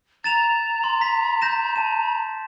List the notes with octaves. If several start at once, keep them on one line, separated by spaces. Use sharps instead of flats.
A#5 A6 E7 F7
C6
B6
G6 A#6 E7
A5 E7